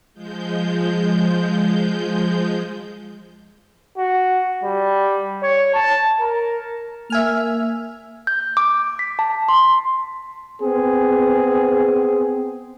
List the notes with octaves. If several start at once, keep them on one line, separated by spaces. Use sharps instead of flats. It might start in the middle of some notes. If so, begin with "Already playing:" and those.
F3 G#3 G6
F#4
G3
C#5
A5
A#4
A#3 E5 G#5 F6
G6
D6
B6
A5
C6
B3 C4 G#4